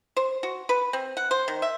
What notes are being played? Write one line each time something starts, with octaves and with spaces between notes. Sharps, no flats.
C5
F#4
B4
C4
F#5
C5
D#3
E5